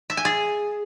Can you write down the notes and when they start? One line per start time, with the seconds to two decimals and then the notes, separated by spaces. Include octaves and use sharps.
0.10 E5
0.17 G#5
0.25 G#4